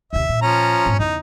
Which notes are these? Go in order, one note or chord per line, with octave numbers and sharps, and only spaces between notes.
D#2 C3 E5
A#2
F3 C#4 A#5
F2 G#2
E2 C#3 D#4